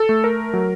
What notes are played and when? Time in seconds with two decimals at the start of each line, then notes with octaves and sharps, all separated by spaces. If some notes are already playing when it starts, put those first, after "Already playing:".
Already playing: A4
0.09 A3
0.24 A#4
0.54 F#3